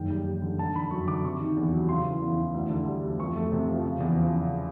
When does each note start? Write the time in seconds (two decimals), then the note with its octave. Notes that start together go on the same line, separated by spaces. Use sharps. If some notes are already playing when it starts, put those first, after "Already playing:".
Already playing: F#1 D#3 G5
0.10 G3
0.26 G3
0.42 D3
0.58 D3 A5
0.76 D3 B5
0.91 F#2 C#6
1.07 D3 D6
1.24 C3 C#6
1.40 D#3
1.56 E2
1.73 F#3
1.89 C#3 C6
2.05 E3
2.22 E2
2.38 E3
2.54 D2
2.70 D3
2.86 G3
3.03 D2
3.19 F2 C#6
3.36 A3
3.52 C3
3.68 F3
3.84 C#3
4.00 E2
4.16 F3
4.33 C#3